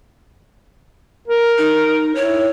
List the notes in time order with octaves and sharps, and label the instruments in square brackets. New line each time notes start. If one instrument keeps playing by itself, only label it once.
[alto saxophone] A#4
[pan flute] D#4
[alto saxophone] E4 [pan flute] C#5